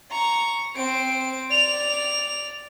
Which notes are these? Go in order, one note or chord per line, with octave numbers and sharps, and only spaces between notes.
A#5 C#6
C4 D7
D5 F7